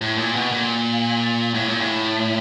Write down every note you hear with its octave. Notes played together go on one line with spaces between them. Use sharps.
A2
A#2
B2
A#2
A2
A#2
A2